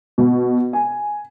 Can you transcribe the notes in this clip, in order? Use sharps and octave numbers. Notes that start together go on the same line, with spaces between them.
B2
G#5